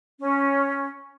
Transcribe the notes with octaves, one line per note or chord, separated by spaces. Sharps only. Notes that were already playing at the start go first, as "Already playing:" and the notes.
C#4